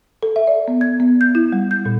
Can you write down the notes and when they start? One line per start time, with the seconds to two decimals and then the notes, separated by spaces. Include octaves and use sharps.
0.23 A4
0.36 E5
0.47 D5
0.68 B3
0.81 G#6
1.00 B3
1.21 G6
1.35 E4
1.53 G3
1.71 G6
1.86 A#2